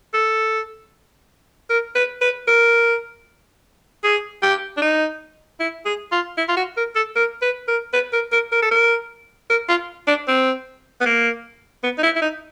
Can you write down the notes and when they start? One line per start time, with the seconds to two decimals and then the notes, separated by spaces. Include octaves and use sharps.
0.13 A4
1.70 A#4
1.95 B4
2.21 B4
2.47 A#4
4.03 G#4
4.42 G4
4.77 D4
4.82 D#4
5.60 E4
5.85 G#4
6.12 F4
6.38 E4
6.49 F4
6.57 F#4
6.77 A#4
6.95 A4
7.16 A#4
7.42 B4
7.68 A#4
7.93 B4
8.13 A#4
8.32 A#4
8.52 A#4
8.62 A4
8.71 A#4
9.50 A#4
9.69 F4
10.07 D4
10.28 C4
11.01 B3
11.06 A#3
11.83 B3
11.98 D#4
12.03 E4
12.16 E4
12.22 D#4